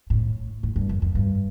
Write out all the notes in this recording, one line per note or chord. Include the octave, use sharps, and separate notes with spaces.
A2
A2
G2
F#2
F#2
G2